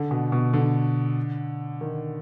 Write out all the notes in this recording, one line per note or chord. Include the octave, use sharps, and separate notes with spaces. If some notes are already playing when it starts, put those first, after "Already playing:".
Already playing: D3
B2
B2
D3
D#3